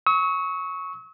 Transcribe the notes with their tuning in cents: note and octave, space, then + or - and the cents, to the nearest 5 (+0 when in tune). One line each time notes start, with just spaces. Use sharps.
C#6 +0 E6 -45